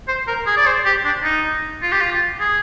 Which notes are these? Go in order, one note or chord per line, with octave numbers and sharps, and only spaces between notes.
C5
A#4
G#4
D5
C5
G4
D4
D#4
F4
G4
F4
G#4